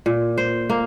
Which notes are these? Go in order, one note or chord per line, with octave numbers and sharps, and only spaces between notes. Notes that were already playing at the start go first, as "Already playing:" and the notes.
A#2
C5
A#3